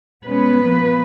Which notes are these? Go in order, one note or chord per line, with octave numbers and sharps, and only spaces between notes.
B2 G#3 B3 C#4 B4
A#2 F3 A#3